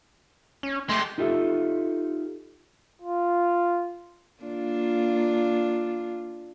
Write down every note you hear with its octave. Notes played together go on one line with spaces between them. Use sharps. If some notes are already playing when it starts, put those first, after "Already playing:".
C#4
G#3 A3 G4 C6
D#4 F4 G4 A4 E5
F4
A#3 D4 F4